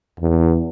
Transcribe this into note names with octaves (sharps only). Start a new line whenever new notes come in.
E2